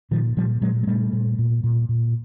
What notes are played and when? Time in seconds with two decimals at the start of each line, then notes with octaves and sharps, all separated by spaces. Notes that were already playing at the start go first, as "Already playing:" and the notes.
0.11 A#2 D#3 F3
0.37 A#2 F3 G3
0.61 A#2 F#3 G#3
0.83 G#3
0.87 A#2 G3 A3
1.13 A#2
1.38 A#2
1.64 A#2
1.89 A#2